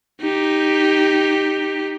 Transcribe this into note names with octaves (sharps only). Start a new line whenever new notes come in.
D#4 G4